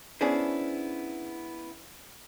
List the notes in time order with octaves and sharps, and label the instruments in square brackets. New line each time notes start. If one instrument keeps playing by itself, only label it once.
[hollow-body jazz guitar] B3 C#4 D4 E4 G#4 C5